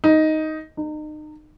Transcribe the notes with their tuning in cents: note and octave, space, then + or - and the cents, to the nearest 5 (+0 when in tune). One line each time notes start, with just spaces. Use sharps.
D#4 +5
D#4 -35